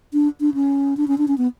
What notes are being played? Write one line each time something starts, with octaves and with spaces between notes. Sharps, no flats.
D4
D4
C#4
D4
C#4
D4
C#4
B3